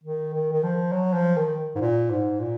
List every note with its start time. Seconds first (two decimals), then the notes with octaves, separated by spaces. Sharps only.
0.04 D#3
0.34 D#3
0.53 D#3
0.63 F3
0.92 F#3
1.14 F3
1.36 D#3
1.75 G#2
1.81 A#2
2.10 G#2
2.40 A#2